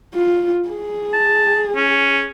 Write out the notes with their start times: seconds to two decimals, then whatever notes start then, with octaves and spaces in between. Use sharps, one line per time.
0.14 F4
0.69 G#4
1.13 A5
1.76 C#4